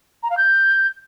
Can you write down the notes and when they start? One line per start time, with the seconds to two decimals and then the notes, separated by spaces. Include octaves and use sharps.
0.23 A#5
0.30 F5
0.37 G6